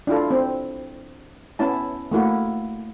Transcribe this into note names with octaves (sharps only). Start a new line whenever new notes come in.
D4 E4 F4 A4
C4
B3 C#4 E4 A5
A3 A#3 E4 F#4